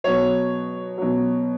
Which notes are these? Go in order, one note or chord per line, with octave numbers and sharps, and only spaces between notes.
B2 F#3 C#5
B2 F#3